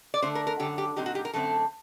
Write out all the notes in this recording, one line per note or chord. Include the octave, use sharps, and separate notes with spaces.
D5
D3 A3 D4 C5
A#4
A#4
F#2 D3 F#3 G4
G4
A#2 F#3 C4 D#4 G4
F#4
G4
A#4
F#2 D3 A3 C4 A4